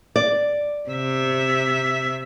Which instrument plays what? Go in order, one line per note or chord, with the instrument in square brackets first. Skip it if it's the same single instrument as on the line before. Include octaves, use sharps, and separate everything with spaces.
[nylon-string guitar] D5
[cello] C3 E5